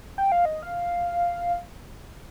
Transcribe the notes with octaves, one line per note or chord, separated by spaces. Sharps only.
G5
F5
D#5
F5